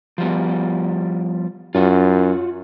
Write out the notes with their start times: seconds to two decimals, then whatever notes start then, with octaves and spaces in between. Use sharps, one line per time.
0.18 F3 G3 B3
1.75 F#2 F4 F#4